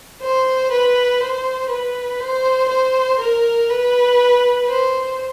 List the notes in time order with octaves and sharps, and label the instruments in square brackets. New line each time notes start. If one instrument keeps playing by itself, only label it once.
[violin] C5
B4
C5
B4
C5
C5
A#4
B4
C5